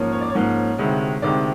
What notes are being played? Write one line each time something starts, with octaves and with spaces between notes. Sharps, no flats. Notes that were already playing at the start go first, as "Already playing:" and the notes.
Already playing: G#2 F3 A#3 C#4
C#5
D5
C#5
G#2 F3 A#3 C#4
D2 C3 D#3 G#3
D2 C3 D#3 G#3 D5